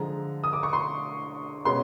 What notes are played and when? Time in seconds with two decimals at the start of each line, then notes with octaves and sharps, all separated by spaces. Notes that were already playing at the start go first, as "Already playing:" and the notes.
Already playing: D3 F3 G#3 A#5
0.44 D#6
0.53 D6
0.63 C#6
0.73 C6
1.65 B2 G#3 C#4 C6